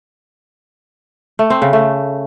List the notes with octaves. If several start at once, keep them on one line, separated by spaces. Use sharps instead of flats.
A3
C4
C#3
A3